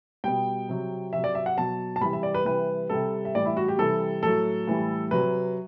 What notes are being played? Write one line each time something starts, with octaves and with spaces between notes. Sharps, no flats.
B2 G3 G5
C3 F#3
C3 F#3 E5
D5
E5
F#5
B2 F#3 A5
A5
C3 E3 G3 B5
E5
D5
B4
C3 E3 G3 B4
C3 G3 A4
E5
A2 E3 G3 D5
E4
F#4
G4
C3 E3 G3 A4
A2 F#3 A4
A2 E3 G3
C3 F#3 B4